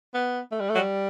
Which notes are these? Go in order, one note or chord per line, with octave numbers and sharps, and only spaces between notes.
B3
A3
G3
A3
F#3
G3